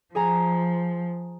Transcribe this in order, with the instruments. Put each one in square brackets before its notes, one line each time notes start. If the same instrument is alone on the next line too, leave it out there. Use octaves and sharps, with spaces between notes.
[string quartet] F3 [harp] G#4 G#5 A#5